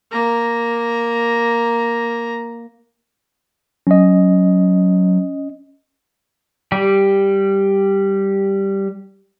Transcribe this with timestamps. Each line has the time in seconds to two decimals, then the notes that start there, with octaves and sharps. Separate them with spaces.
0.11 A#3 A#5
3.87 F#3 C#4 D#5
6.72 G3 G4